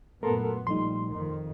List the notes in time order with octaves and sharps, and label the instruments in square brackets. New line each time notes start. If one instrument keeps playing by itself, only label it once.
[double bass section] F#2 A#2 B3 [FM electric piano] A3 C6 [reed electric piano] A4 A#4
[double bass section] A#1 G3 [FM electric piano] F3 A3 D#4 [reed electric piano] C6
[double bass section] F2 D#3